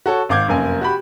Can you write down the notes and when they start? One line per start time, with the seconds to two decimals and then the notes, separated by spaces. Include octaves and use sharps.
0.06 F#4 A4 C#5
0.29 G#1 F5 D6 G6 G#6
0.48 F1 F#2 A#3 G#5
0.81 F#4 G4 B5